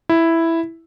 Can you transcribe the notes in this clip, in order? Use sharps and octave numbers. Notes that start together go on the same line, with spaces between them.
E4